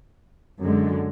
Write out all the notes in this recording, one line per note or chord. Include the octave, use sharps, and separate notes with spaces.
F#2 D3 G#3